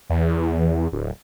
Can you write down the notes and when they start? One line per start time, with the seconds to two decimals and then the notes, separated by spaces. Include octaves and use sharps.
0.10 E2
0.92 D1